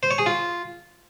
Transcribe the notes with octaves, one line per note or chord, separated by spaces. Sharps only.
C5
C#5
G#4
F4